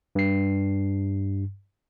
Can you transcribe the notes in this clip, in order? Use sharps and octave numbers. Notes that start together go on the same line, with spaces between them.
G2 C7